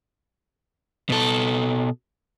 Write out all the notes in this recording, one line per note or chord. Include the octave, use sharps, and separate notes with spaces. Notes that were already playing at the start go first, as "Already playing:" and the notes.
B2 A4